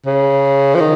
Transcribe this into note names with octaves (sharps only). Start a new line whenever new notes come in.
C#3
F3
D#3